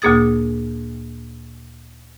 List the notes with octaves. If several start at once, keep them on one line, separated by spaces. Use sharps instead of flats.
D2 A#2 A#3 G#4 D#6 A6